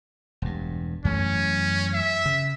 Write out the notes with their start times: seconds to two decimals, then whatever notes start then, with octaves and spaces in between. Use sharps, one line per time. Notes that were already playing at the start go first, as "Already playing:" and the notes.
0.42 E1 G2
1.05 F#2 E3 A3 C#4
1.93 E5
2.26 C#3